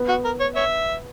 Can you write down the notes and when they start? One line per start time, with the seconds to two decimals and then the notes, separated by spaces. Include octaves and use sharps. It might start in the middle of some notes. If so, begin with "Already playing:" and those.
Already playing: B3
0.09 F#4
0.25 A#4
0.40 C#5
0.56 C#5 E5